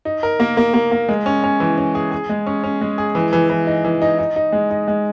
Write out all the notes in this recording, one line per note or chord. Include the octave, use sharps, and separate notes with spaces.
D#4
A#4
A#3
A#3
A#3
A#3
G#3
C#4
C#4
E3
C#4
G#4
G#4
G#3
C#4
C#4
G#3
G#4
E3
E3
E3
D#4
E3
D#4
D#4
D#4
G#3
D#4
G#3